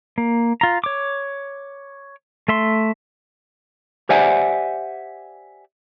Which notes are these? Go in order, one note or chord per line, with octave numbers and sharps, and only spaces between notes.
A#3
F4 A#5
C#5 D6
A3 E5 C6
G4 C5 D5 E5 F#5 G#5